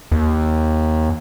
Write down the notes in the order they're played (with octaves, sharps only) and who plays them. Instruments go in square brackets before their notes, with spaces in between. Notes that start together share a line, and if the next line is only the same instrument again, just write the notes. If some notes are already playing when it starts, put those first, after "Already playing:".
[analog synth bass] D#2